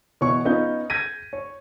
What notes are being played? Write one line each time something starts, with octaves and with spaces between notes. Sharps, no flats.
B2 E3 C#5 C#6
B3 C#4 D#4 F4 G6
G6 G#6 A#6 B6 D#7
C#5